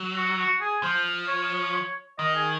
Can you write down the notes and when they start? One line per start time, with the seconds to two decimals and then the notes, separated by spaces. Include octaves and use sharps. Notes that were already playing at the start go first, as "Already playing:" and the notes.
Already playing: F#3
0.16 F#4
0.39 F#4
0.61 G#4
0.83 F3 C5
1.28 C#5
2.18 D#3 D#5
2.35 G#4